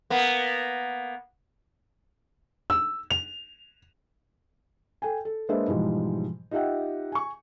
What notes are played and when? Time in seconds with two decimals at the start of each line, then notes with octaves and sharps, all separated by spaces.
0.10 A#3 B3
2.70 E6
3.10 F7
5.02 A4 G5 G#5
5.25 A4
5.49 G#3 A#3 D4 B4 C5 E5
5.68 G#2 B2 E3 F3 G3 G#3
6.51 D#4 F4 G4 E5 F#5 G5
7.12 G#5 C#6